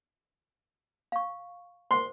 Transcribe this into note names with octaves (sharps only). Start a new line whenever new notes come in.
F5 C#6
C5 C6